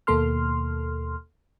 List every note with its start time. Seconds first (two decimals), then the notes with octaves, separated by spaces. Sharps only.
0.07 D#2 B2 A#3 A4 C6 F6